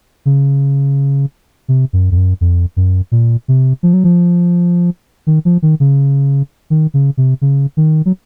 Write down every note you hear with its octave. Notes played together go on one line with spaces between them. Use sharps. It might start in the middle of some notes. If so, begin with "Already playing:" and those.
C#3
C3
F#2
F2
F#2
F2
F#2
A#2
C3
F3
F#3
F3
D#3
F3
D#3
C#3
D#3
C#3
C3
C#3
D#3
F#3